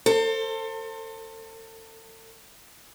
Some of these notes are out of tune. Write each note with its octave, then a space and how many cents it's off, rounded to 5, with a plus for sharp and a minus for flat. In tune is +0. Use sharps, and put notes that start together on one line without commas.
A4 +35 C5 +25